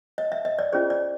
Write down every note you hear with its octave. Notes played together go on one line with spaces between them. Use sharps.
D#5
E5
D#5
D5
C#4 F4 G#4 C5 D5
D5